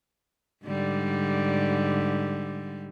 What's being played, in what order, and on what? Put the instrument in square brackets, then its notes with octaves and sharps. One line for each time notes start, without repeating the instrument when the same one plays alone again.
[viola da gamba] G#2 D3 G3